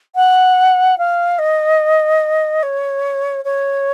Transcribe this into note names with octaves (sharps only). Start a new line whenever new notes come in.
F#5
F5
D#5
C#5
C#5